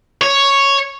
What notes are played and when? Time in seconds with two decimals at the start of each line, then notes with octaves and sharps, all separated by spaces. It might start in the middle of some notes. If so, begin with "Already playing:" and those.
0.22 C#5